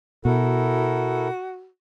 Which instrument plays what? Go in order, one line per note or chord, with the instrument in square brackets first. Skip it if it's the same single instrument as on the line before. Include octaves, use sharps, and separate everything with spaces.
[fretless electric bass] B2 [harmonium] E4 A4 A#4 [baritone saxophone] F#4